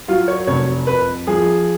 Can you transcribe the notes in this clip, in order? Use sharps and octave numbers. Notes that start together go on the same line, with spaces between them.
F#3 F4
C#5
F1 C#5
F2 B4
F3 G#4